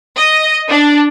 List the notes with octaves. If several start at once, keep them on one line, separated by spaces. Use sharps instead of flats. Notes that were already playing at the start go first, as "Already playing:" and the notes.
D#5
D4